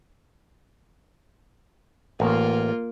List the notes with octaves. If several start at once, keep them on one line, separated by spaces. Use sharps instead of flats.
A1 A#3 F4